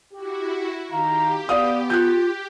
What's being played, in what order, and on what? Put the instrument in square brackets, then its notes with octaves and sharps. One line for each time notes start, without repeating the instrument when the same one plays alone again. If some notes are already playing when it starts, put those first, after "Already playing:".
[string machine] E4 F#4 [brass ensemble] G4
[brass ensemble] D#3 F5 A#5 [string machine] G4
[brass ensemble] B3 [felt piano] D5 F5 D#6
[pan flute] F4 [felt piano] F#6 G6